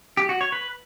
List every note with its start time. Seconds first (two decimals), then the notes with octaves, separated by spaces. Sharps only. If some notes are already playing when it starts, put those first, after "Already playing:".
0.17 G4
0.29 F#4
0.41 C#5
0.52 B4